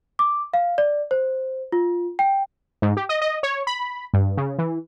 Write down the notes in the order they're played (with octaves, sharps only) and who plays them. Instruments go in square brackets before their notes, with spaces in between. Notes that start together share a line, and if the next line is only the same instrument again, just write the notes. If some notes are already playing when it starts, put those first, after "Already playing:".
[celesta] D6
F5
D5
C5
F4
G5
[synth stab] G#2
G4
D#5
D#5
C#5
B5
G2
C#3
E3